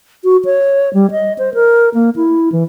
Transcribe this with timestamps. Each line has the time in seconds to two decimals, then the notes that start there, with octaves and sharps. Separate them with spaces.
0.24 F#4
0.45 C#5
0.94 G3
1.11 D#5
1.38 C5
1.54 A#4
1.94 A#3
2.16 E4
2.52 E3